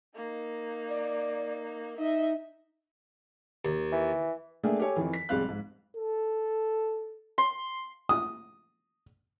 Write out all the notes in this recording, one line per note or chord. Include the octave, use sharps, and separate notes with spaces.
A#3 D#4
D5
D#4 D#5 E5
D#2
E3
A3 A#3 D4 G#4 E5 G5
G4 A4 C#5 G#5
F2 D#3 E3
B6
B1 G3 G#3 C4 F5 F#6
G#2
A4
C6
D#6